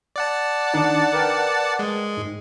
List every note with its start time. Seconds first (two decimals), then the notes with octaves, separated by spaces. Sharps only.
0.16 D5 F#5 A5
0.74 D#3 D4 D#4
1.13 A#4 B4 G5
1.79 G#3
2.17 G#2